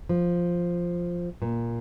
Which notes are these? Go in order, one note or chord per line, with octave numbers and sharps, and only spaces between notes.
F3
A#2